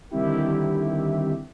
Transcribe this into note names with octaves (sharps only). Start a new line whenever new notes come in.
D3 D#3 G3 C4 E4 G4